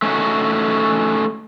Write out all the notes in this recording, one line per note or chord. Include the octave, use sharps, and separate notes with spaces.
A3 C#4 D#4 F#4